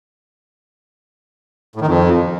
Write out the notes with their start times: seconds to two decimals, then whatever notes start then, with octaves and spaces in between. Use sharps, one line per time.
1.76 A2
1.81 D#3
1.87 F2